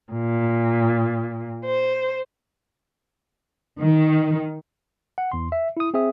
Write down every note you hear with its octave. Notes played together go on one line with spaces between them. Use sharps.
A#2
C5
D#3
F#5
E2 C6
E5
E4 D#6
C4 G#4 E5 D#6